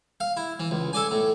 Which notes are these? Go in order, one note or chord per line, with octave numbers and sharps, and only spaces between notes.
F5
E4
E3
C#2
A4 D5 G#5
A2